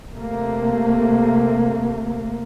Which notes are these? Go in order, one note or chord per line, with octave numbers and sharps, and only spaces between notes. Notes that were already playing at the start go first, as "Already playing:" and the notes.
C3 A3 A#3